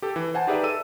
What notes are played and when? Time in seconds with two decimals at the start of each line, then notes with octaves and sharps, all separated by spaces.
0.02 G4 A4
0.16 E3
0.34 C5 F#5 G#5 A5
0.47 D#4 G4 G#4 B4 D5 E5
0.63 A4 E6 D#7